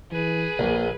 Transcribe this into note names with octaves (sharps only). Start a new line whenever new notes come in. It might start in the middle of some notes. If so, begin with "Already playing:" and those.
E3 G#4 B4
A#1 A#3